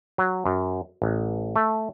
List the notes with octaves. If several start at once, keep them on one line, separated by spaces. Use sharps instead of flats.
F#3
F#2
A1
A3